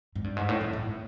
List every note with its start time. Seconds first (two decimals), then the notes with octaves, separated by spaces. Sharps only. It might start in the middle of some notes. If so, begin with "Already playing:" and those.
0.15 G#2
0.24 G2
0.37 G#2
0.49 A2
0.61 A2
0.73 A2